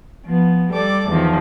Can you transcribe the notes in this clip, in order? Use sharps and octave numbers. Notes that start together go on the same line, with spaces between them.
F3 B3
G3 A4 D5 D6
E2 D#3 F3